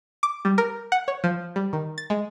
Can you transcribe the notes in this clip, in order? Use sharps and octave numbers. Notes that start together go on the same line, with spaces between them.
D6
G3
A#4
F#5
C#5
F3
G3
D#3
A6
G#3